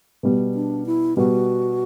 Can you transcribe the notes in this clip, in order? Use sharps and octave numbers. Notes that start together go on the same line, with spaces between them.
B2 G3 B3
D4
E4
B2 G3 B3 F#4